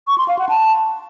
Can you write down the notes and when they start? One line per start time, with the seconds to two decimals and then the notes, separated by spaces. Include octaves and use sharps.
0.08 C#6
0.18 C6
0.28 F5
0.39 F#5
0.49 A5